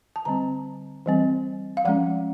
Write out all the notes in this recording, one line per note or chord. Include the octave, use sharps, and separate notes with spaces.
A5
D3 G3 C4 A#5
E3 G3 C4
F5
F3 G#3 C#4 F#5